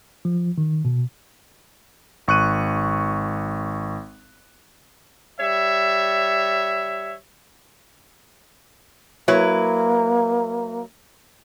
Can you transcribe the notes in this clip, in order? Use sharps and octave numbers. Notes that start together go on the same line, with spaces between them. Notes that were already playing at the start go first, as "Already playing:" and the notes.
F3
D#3
B2
G#1 C#6 F#6 D#7
G3 C#5 E5
F#3 A#3 E4 B4